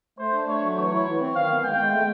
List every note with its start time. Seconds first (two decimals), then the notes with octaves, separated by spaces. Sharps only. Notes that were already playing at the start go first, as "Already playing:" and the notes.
0.18 A3 C5
0.33 D4
0.48 A3 C#5
0.62 F#3
0.76 E3 C#5
0.92 E4
1.06 E3
1.21 C4
1.35 D#3 F5
1.49 B3
1.64 G#3 G5
1.78 G#3
1.92 A3